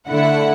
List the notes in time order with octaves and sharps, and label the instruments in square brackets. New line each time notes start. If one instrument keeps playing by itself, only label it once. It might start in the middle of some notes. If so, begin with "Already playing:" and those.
[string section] D3 A3 E4 F#5